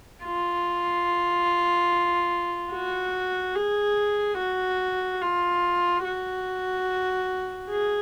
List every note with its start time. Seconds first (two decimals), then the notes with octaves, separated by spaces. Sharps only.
0.23 F4
2.73 F#4
3.55 G#4
4.38 F#4
5.21 F4
6.04 F#4
7.70 G#4